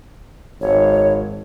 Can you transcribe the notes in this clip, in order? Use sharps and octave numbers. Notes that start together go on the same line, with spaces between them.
G#1 C#5